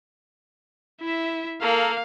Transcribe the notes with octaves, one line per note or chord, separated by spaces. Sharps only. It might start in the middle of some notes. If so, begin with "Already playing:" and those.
E4 E5
A#3 A4 A#4 F5